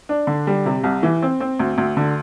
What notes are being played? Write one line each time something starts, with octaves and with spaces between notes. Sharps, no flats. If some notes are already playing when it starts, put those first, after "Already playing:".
D4
D3
G3
C3
C2
E3
C4
C4
D2
D2
D3